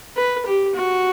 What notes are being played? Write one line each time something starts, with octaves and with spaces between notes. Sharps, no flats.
B4
G4
F#4